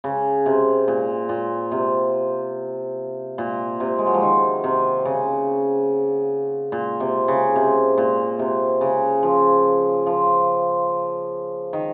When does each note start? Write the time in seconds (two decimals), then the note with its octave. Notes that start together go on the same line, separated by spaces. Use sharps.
0.04 C#3
0.46 C3
0.88 A#2
1.29 A#2
1.72 C3
3.38 A#2
3.80 C3
3.98 G#3
4.06 F#3
4.14 F3
4.22 D#3
4.64 C3
5.05 C#3
6.72 A#2
7.00 C3
7.28 C#3
7.56 C3
7.97 A#2
8.39 C3
8.81 C#3
9.23 F3
10.06 F3
11.73 D#3